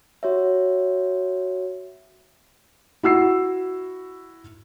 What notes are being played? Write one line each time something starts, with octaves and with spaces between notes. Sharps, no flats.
F#4 C#5 E5
E4 F#4 E6 C7